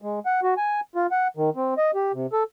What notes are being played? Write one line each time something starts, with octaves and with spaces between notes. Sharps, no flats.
G#3
F#5
F#4
G#5
F4
F#5
D#3
C4
D#5
G4
C3
A4